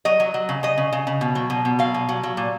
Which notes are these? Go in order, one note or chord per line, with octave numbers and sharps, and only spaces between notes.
F#3 D#5
F#3
F#3
C#3
C#3 D#5
C#3
C#3
C#3
B2
F#3
B2
B2
F#3 F5
B2
F#3
F#3
A#2